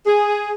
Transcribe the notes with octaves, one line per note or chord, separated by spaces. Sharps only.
G#4